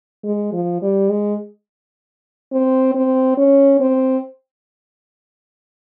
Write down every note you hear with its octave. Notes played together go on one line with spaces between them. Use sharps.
G#3
F3
G3
G#3
C4
C4
C#4
C4